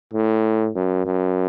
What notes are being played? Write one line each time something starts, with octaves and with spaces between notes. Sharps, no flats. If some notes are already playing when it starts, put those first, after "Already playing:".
A2
F#2
F#2